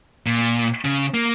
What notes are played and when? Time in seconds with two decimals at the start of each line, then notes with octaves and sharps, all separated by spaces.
0.26 A#2
0.85 C#3
1.14 A#3